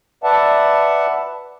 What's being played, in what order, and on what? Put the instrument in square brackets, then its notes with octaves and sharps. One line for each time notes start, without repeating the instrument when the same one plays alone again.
[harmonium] B4 D5 E5 F#5 A5